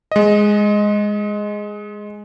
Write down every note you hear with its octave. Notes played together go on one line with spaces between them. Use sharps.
G#3 D#5